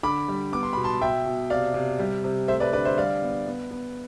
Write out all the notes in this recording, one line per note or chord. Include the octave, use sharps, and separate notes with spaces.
D3 B5 D6
G3
B3 D6
C6
B2 B5
A5 C6
B2 E5 G5
B2
C3 D5 F5
C3
G3
C3
A3 C5 E5
B4 D5
D3 B4 D5
C5 E5
G3 D5 F5
B3
B3
B3